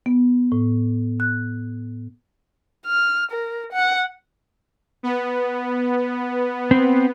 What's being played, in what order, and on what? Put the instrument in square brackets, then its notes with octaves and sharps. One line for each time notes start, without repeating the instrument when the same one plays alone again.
[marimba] B3
A2
F#6
[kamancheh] F6
A#4
F#5
[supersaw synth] B3
[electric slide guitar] C4